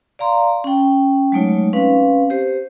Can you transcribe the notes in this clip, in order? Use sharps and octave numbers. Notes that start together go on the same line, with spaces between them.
D5 F5 A#5 C6
C#4 G5
F#3 G#3 A3 D#4 C#5
C4 C#4 B4 F5
G4 C5